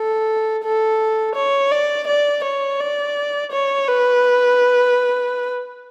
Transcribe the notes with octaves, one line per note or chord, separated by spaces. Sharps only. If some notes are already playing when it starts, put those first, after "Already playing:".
Already playing: A4
A4
C#5
D5
D5
C#5
D5
C#5
B4